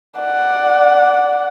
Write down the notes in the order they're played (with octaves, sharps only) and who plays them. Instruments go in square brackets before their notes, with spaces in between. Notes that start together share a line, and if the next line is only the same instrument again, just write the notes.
[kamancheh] D5 F#5